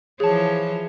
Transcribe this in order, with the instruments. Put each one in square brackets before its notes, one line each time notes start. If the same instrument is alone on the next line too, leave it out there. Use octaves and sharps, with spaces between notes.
[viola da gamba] E3 F3 C#5 [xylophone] G#4 A5